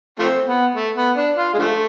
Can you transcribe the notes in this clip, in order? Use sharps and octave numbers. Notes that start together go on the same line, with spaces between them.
F3 A3 C4
B3
A3
B3
D4
F4
G#3
D3 F3 A3